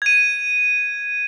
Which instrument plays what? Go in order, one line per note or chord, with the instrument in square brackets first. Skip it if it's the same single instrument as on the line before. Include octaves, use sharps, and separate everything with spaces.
[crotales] G#6 D#7